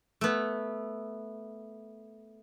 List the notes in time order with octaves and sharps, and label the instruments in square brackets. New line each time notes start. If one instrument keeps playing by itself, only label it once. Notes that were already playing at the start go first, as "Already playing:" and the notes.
[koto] A3 B3